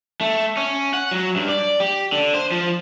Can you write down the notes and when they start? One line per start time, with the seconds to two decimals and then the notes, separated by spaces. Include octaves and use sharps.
0.21 A3
0.57 C#4
0.94 F#5
1.11 F#3
1.36 G2
1.49 D5
1.80 G4
2.12 D3
2.34 C5
2.52 F3